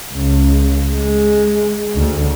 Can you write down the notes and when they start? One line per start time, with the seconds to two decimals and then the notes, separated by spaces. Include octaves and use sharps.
0.13 C#2
0.94 G#3
1.95 D2